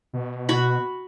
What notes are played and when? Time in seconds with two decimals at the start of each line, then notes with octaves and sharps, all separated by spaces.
0.13 B2
0.49 F#4 B5